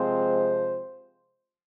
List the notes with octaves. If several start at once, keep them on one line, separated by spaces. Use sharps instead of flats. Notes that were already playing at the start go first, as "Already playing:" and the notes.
Already playing: C3 F3 G#3 C4 C5